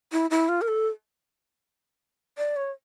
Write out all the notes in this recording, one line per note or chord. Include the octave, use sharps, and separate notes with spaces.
E4
E4
F4
A#4
A4
D5
C#5